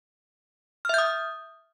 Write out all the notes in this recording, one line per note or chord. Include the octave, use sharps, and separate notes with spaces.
E5 D#6 F6 G6